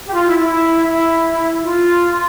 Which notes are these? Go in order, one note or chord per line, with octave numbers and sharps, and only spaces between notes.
G4
F4
E4
E4
E4
F4